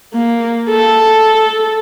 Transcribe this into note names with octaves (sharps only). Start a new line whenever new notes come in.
A#3
A4